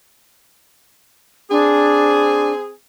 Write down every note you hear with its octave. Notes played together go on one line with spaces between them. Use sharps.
C4 D4 G#4